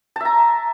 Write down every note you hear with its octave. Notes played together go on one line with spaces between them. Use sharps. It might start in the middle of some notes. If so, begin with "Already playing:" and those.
E5 A5 A#5